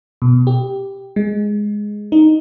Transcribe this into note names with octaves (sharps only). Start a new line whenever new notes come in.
B2
G4
G#3
D#4